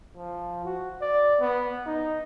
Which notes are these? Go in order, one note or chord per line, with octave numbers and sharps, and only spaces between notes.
F3
F#4
D5
B3
D#4